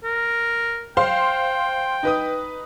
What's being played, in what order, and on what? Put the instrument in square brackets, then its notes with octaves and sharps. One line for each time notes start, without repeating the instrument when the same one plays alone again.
[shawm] A#4
[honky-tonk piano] C5 F5 C6 [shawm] G5
[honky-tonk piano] D#4 B4 D#6